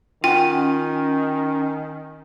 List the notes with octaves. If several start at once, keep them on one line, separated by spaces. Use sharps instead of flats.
D#3 C#4 F4 F#5 G5